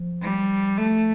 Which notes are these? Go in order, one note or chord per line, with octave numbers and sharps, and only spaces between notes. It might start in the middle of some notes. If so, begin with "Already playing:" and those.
Already playing: F3
G3
A3